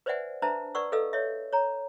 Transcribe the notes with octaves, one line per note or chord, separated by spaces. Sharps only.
B4 C5 D5 E5 F#5 G#5
D4 B4 C5 E5 A5 A#5
B4 D5 F#5 C#6 E6
A4 B4 D#5 F5 E6
C#5 D#5 E5
C#5 A#5